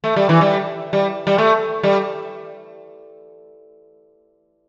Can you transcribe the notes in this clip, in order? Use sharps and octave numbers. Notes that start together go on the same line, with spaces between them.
A3
G3
E3
G3
G3
G3
A3
G3